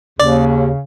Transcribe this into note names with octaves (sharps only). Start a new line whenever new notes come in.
D#2 C#3 D5